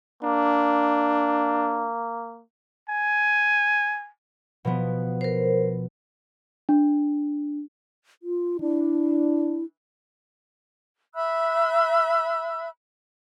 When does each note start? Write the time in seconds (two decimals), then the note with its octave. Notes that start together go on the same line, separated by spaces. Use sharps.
0.23 A#3 D4
2.89 G#5
4.65 B2 F3 B3
5.21 A#4 C5
6.69 D4
8.23 F4
8.60 D4 E4
11.14 E5 B5 E6 F#6